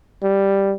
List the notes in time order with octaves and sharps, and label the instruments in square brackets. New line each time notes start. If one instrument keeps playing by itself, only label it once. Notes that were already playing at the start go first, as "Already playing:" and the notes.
[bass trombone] G3